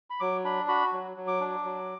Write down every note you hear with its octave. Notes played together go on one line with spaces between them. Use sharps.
B5
F#3 D6
D4 B5
F#4 B5
F#3
F#3
D6
D4
F#3